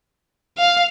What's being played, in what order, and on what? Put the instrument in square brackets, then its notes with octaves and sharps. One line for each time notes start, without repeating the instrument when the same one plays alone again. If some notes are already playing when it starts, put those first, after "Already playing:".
[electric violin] F5